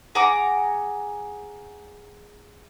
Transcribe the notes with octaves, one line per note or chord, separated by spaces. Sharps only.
G#4 F#5 A#5 D6